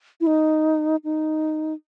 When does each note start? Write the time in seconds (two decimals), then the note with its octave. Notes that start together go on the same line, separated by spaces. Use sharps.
0.21 E4
0.27 D#4
1.04 D#4